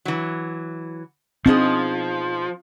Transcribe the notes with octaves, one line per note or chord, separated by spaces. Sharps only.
E3 F#3
B2 F3 C4 D4 D#4 G#4